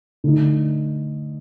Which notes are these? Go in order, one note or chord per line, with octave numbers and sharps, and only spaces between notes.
D3 A3 D#4